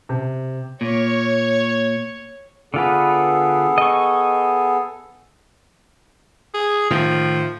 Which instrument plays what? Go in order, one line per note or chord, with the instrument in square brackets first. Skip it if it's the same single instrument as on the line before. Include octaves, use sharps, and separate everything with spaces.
[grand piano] C3
[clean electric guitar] A#2 [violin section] C#5
[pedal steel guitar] D3 F4 B4 [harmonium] B3 G#4 A4
[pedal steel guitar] D#5 C#6
[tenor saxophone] G#4
[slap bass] A2 D#3 [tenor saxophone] F3